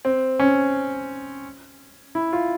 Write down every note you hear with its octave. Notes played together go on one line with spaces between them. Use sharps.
C4
C#4
E4
F4